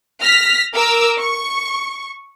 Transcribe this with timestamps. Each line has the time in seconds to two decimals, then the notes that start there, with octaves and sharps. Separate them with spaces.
0.21 F6 A#6 B6
0.74 A#4 D6 E6
1.19 C#6